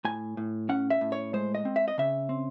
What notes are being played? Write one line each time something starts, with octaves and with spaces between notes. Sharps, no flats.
A2 G#5
A2
C#4 F#5
E5
A2
C#5
G#3 C5
D#5
C4
E5
D#5
C#3 E5
C4